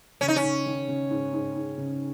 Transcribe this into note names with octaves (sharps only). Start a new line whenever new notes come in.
C#3 C#4
D#4
C#4
C#3
D#3
C#3
G#2
G#2
G#2
C#3